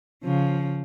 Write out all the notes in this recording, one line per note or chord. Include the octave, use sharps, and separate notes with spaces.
C#3 F3